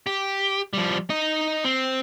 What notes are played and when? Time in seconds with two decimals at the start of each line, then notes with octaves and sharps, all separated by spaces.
0.07 G4
0.73 F3 G3
1.10 D#4 D#5
1.65 C4